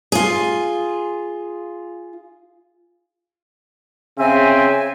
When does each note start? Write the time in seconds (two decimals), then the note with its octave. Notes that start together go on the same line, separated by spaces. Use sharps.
0.12 F4 G#4
4.18 C#3 C4 E5 G#5